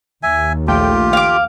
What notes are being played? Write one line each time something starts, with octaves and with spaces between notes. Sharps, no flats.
D#2 E5 G#5
A#1 A3 F4 G4 G5
F5 D6